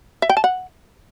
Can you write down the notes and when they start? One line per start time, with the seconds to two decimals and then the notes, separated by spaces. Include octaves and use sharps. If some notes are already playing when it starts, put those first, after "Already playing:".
0.22 E5
0.29 G5
0.37 A5
0.44 F#5